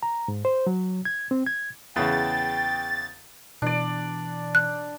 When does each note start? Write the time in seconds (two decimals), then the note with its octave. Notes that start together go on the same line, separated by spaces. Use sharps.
0.03 A#5
0.28 G#2
0.45 C5
0.67 F#3
1.05 G#6
1.31 C4
1.46 G#6
1.96 E2 C#3 G5 A6
3.62 B2 E3 D4 D5
4.55 F#6